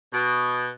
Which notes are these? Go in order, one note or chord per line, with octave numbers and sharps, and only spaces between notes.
B2